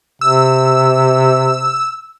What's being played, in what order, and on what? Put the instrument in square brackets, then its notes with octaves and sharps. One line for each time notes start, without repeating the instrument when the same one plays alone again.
[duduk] C3 [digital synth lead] E6